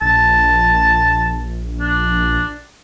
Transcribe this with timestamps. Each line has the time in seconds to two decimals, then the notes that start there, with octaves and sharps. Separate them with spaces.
0.01 A#1 A5
1.81 D4